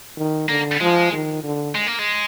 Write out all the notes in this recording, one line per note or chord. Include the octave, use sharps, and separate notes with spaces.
D#3
D3 A#3
F3 G#3
D#3
D3
G#3
A#3
G#3